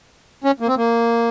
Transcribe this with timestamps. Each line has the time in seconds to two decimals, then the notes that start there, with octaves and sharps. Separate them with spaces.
0.44 C#4
0.60 A#3
0.68 C4
0.77 A#3